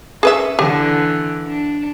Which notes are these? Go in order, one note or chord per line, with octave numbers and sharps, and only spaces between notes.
C#4 G#4 B4 E5
D3 E3 G4
D4